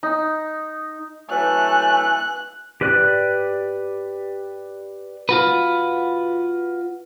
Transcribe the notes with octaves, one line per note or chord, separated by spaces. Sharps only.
D#4
E3 F#3 A3 G#5 F#6
G4 B4 D5 F#6
F4 F#4 B4